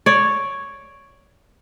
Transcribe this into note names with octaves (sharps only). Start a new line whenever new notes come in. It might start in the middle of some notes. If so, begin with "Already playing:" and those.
C#5 D5